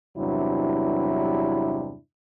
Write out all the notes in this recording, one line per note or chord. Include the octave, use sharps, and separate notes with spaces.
E2 G2 C3 F#3 D4 E4